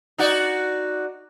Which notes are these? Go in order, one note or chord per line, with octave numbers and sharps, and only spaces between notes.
D#4 F#4 D5